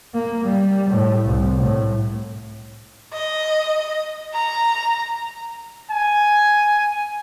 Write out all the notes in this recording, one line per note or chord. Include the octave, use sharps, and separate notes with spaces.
A#3
G3
A2
C2
A2
D#5
A#5
G#5